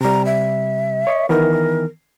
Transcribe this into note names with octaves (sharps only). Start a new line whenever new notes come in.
C3 G3 A#5
E5
C#5 D#5 C#6
D#3 E3 B3 A#4